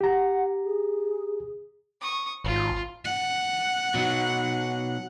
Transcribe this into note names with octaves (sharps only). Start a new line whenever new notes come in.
G4 F#5 A#5
G#4
C#6 D#6
G#1 F4
F#5
B2 F#3 D#4